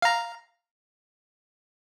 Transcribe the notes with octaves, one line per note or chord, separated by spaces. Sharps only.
F5 A#5